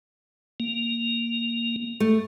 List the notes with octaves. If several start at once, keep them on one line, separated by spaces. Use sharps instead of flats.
A#3
A3